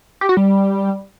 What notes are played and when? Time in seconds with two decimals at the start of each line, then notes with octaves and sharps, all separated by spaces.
0.21 G4
0.29 F#4
0.37 G3